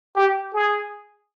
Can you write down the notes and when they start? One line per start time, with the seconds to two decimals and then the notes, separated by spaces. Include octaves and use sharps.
0.16 G4
0.54 G#4